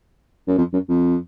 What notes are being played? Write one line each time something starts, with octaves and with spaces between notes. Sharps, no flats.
F#2
F2
F#2
F2